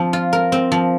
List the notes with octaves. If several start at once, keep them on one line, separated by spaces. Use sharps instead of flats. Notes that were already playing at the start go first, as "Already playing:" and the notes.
Already playing: F3 C4
F4
A#4
C4
F3